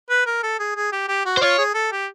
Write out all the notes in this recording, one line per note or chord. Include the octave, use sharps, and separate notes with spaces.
B4
A#4
A4
G#4
G#4
G4
G4
F#4
C5
F4 C#5
G#4
A4
G4